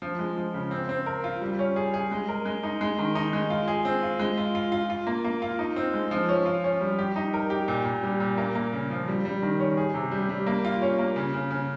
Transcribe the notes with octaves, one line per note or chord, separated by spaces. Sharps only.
F3
G#3
F3
C#3
C4
C4
A#4
F4
G3
C#4
G#4
G#4
G#3
A#4
G#3
D#4
G#3
D#3
D#4
G#3
F4
G#4
C4
F4
G#3
F4
F4
F4
F4
A#3
A#3
F4
D#4
C4
G#3
F3
C#4
F4
C#4
G3
G4
D#4
A#4
G4
A#2
A#2
G3
A#2
A#3
A#3
C#3
F3
G3
G3
D#3
C#4
G#4
C3
G3
G3
A#3
F4
C#4
A#3
C#3
C#3
C#3